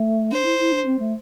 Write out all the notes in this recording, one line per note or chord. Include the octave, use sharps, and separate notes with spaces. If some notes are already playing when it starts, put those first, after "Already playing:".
Already playing: A3
D4 C5
E4
E4
D4
C4
A3